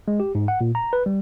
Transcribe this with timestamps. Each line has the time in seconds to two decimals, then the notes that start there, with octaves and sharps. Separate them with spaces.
0.08 G#3
0.20 G4
0.35 G#2
0.48 F#5
0.61 A#2
0.75 A#5
0.93 B4
1.06 G3